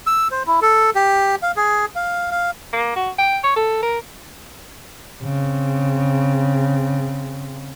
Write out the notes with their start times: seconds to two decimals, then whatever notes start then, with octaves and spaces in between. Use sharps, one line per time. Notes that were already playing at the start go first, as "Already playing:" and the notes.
0.07 E6
0.31 C5
0.47 E4
0.62 A4
0.95 G4
1.42 F5
1.57 G#4
1.96 F5
2.31 F5
2.73 A#3
2.96 F#4
3.18 G5
3.44 C#5
3.56 A4
3.83 A#4
5.22 C#3 C4